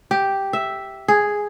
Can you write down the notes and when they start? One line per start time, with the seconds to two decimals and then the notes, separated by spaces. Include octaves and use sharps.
0.11 G4
0.53 E5
1.08 G#4